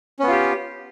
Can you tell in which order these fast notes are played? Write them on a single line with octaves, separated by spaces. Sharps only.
C#4 B3 F4 G4